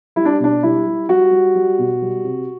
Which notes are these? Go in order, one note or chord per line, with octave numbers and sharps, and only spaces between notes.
G3 E4
D4
B2 D4
G3 E4
G3
G3 F#4
G3
G3
B2
G3
C3